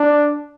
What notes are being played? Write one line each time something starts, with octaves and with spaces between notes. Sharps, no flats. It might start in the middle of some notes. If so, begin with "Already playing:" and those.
Already playing: D4